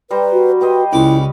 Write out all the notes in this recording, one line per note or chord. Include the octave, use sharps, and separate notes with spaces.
G3 B4 C5 A#5
F#4
G4 B4 C5 D#5
C#2 C#4 E4 B4 C#5 D6